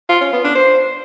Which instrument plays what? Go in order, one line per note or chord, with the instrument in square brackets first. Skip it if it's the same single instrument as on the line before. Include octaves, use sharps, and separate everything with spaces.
[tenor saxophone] F4
C#4
B3
D4
C5